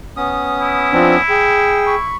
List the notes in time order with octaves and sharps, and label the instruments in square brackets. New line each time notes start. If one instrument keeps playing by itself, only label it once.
[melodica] B3 C#4 D#6
[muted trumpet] E4
[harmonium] F3 C4 D4
G#4 G5
[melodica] B5 C#6